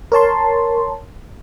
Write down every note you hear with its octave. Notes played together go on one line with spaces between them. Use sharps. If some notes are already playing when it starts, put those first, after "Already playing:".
A#4 C#5 A5 C6